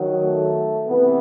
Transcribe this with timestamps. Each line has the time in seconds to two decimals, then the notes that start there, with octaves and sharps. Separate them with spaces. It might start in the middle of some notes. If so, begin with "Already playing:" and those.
Already playing: D#3 F#3
0.22 A3
0.87 C3 E3 B3